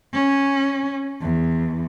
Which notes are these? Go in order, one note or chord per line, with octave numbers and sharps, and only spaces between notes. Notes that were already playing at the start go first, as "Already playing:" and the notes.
C#4
E2